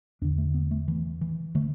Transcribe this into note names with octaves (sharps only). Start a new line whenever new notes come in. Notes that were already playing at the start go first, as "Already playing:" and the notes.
E2 D3 D4
A3
B3
A3
E3
E3
D3 A3